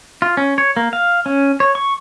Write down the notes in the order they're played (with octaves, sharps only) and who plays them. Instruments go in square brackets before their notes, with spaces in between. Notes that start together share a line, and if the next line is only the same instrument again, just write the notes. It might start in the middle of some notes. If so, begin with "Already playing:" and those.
[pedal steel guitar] F4
C#4
C#5
A#3
F5
C#4
C#5
C#6